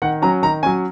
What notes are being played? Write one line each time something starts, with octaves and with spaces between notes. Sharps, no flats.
D#3 F#5
F#3 C#4 A#5
D#3 A#5
F#3 C#4 G#5